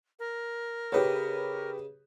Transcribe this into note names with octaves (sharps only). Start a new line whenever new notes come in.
A#4
C#3 G4 B4 C#5 D#5